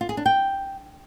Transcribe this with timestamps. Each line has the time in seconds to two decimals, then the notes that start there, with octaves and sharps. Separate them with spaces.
0.01 F4
0.09 G#4
0.17 D4
0.26 G5